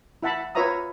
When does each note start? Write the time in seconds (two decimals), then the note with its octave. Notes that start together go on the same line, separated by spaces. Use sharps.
0.23 E4 E5 F#5 A5 B5
0.55 F4 B4 C#5 E5 A#5 D#6